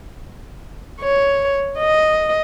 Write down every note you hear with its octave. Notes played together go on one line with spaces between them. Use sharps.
C#5
D#5